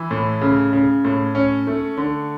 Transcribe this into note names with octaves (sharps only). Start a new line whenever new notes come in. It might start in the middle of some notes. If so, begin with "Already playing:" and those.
Already playing: E3
A2
C#3
C#3
A2
C#4
A3
D3